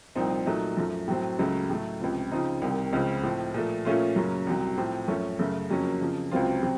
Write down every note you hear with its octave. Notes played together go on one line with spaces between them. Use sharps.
C2 A#2 F3 C4 D#4
A#2 F#3 A3 D#4
F#2 F3 A3
A2 F#3 C4
C#2 C#3 F#3 A3
A2 F#3 A3
C#2 C3 F3
C#3 F3 C4 D#4
C2 C3 D#3
C#2 C#3 F3 C4
A2 F3 C4
A#2 F3 A3
A#2 F3 A3 C#4 F4
F#2 C#3 F#3 A#3 C#4
C2 C3 F#3
A2 F3 C4
F#2 F3 A3 C#4
F#2 C#3 A3
F2 C#3 F#3 A#3 C#4
F2 C#3 F3
C#2 C3 F#3 C4 F4
C3 F#3 C4